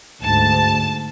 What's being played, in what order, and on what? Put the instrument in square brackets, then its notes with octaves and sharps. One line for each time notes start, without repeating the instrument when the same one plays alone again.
[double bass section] D2 G#2 [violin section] A5